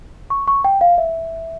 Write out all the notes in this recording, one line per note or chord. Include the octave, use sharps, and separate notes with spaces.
C#6
C#6
G5
F5
E5